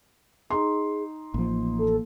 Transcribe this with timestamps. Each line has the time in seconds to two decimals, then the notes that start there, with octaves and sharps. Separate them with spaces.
0.50 D#4 G#4 C6
1.34 A1 F3 A#3
1.79 A4